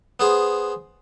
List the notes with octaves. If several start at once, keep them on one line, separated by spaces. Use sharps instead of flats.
B3 G#4 C5